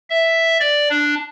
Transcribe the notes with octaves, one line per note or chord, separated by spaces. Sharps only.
E5
D5
D4